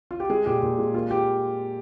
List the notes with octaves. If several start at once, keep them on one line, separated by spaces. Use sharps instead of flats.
F4
G4
G#3 G#4
A#2 G4
A#2
G#3
A#3 F4
A#3 G4